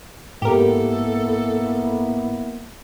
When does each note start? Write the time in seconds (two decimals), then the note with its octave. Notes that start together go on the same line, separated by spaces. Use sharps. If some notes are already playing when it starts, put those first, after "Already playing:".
0.42 G#2 A#3 B3 E4 G4 A4 A#4